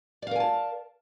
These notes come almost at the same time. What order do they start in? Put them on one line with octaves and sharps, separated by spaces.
D5 F5 A#4 G#5 A5